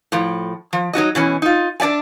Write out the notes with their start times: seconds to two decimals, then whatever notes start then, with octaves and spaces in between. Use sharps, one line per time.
0.12 A2 F3
0.73 F3
0.93 F#3 D#4 F#4 D#5
1.15 B2 E3 C#4
1.42 D#4 F4
1.80 D4 D5 E5 G#5